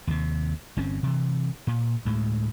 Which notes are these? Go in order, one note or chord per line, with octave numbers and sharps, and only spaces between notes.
D#2 C3
G1 C4 C#4
C3 E3
A#2
D2 A2 G#3